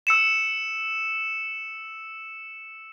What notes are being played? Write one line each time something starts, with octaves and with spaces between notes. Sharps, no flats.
E6 C#7 E7